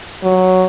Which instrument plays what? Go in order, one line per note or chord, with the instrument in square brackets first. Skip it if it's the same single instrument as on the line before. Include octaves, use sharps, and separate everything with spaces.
[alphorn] F#3